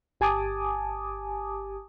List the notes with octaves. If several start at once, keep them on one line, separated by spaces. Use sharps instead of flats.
G1 G4 G#5 A5 D6 D#6